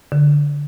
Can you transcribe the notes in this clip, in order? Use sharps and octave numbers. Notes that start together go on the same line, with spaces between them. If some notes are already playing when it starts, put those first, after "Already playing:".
D3